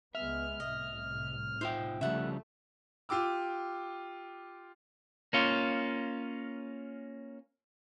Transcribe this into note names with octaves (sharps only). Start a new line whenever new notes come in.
C#2 G#3 B3 E5 F6
C2 A2 D#5
D#4 F4 C5 E5 G5 D#6
C#3 F3 G3 A3 E5 F#5
F4 G4 D6 E6
A#3 C#4 F4